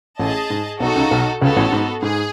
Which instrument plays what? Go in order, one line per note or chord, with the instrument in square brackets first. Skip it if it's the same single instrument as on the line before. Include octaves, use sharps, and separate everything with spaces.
[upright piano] A1 A2 [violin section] G#4 D#5 A5
[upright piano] G#2
[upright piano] B1 B2 [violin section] D#4 F#4 A4 D#5
[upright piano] C#2 C#3
B1 B2
[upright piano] C#2 C#3 [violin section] B3 F#4 A4
[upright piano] A1 A2
G#2
[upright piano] G#2 [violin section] G#4